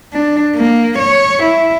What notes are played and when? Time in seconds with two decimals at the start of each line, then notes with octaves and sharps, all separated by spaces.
0.13 D4
0.55 A#3
0.98 C#5
1.43 E4